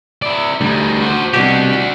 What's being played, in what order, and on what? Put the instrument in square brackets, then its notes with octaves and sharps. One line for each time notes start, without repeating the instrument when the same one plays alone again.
[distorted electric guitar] E4 D5
[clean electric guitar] D2 [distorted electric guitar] G3 D#4
[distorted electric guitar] F#4 C5
[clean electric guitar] C2 B2 G4 [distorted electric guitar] D4 F#4